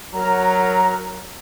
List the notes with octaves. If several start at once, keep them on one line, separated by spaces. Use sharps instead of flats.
F#3 A#4 A#5